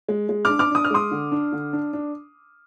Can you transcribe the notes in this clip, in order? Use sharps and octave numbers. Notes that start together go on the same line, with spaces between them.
G#3
G#3
D4 D6 F6
D6 F6
D4 D#6
F6
G#3 C6 D#6
D3
D4
D3
D4
D4